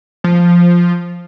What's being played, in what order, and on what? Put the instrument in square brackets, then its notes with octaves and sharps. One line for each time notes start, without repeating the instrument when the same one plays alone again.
[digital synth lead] F3